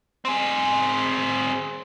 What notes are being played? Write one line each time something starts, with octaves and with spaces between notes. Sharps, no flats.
C4 G#4